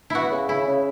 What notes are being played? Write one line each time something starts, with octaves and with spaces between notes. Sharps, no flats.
B3 E4 F#4
C#3
C#3 E4
C#3